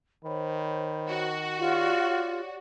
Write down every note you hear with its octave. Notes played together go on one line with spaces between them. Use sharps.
D#3 C5 C#5 B5
F#4
F4 G4 C#5 D5